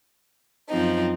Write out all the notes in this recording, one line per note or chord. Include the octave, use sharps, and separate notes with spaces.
F#2 F3 C4 D#4